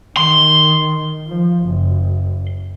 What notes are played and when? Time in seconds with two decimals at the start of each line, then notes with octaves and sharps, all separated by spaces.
0.17 D#3 C6
1.28 F3
1.65 F#1